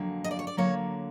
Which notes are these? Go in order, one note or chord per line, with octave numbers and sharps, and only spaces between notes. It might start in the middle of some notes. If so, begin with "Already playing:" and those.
Already playing: F2 D3 F#3 A#3
D#5
D5
C#5
D5
D3 F#3 A#3 C#5